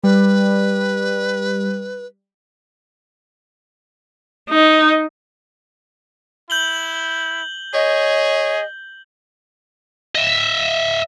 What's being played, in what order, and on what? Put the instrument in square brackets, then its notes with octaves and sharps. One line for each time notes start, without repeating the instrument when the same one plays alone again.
[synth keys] G3 [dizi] B4
[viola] D#4
[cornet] E4 [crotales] G6 F#7 G7
[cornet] G#4 [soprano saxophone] C#5 [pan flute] D#5
[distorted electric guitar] D#5 E5